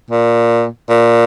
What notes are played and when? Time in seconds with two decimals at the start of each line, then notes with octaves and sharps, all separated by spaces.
0.11 A#2
0.90 A#2